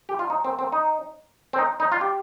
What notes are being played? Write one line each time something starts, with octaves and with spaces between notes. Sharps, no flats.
G4
F4
D#4
C4
C4
D#4
C4
D#4
D#4
F4
G4